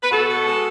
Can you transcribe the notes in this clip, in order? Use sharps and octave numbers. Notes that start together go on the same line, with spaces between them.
B4
B2 F#4 A4
B2
G#3